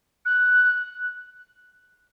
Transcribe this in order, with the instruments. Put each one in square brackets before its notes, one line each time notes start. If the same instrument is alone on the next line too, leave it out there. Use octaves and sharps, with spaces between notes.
[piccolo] F#6